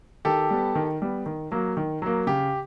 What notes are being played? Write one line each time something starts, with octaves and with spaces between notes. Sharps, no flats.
D#3 G4 A4
G3 B3
D#3
G3 B3
D#3
F#3 A#3
D#3
F#3 A#3
C#3 G4